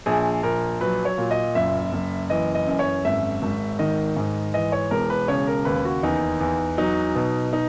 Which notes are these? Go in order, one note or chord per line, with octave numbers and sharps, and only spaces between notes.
A#1 G#4
A#1 A#4
F#3 B4
C#5
A#2
D#5
F#1 E5
F#1
E3 D#5
D#5
F#2
C#5
G#1 E5
G#1
D#3 D#5
G#2
E3 D#5
C#5
E1 A#4
B4
C#3 C#5
A#4
D#2 B4
F#4
E2 D#4
E2
F#3 D#4
B2
D#4